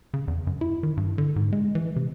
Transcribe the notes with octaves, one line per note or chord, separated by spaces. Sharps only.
C#3
E2
F#2
E4
D#3
G2
D3
G#2
G#3
E3
C3